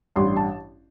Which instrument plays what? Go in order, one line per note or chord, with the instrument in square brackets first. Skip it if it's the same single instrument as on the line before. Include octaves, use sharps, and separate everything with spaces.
[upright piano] A1 G2 G3 D4 C6
A5